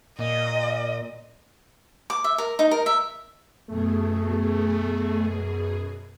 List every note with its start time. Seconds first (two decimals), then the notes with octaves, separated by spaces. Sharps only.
0.19 A#2 D#5
2.10 D6
2.24 E5
2.38 A#4
2.59 D#4
2.71 A#4
2.86 E5
3.68 F#2 B2 A3 G#4